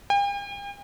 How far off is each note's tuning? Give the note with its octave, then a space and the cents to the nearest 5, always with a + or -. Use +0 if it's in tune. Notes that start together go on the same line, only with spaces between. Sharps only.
G5 +45